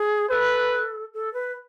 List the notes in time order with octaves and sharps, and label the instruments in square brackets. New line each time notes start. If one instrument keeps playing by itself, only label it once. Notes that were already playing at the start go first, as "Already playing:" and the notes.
Already playing: [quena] G#4
[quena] A4 [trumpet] B4
[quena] A4
B4